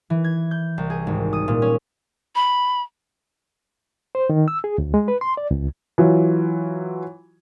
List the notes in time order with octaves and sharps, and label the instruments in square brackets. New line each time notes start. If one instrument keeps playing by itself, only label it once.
[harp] E3
G#6
G6
C2
G#4
G#1
D#6
A#2
C#4
[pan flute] B5
[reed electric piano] C5
D#3
E6
G#4
D2
G#3
B4
C6
D5
C#2
[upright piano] E3 F#3 F4